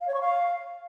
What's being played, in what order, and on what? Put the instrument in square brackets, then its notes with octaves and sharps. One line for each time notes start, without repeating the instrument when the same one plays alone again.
[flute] F5
C#5
C#6
F5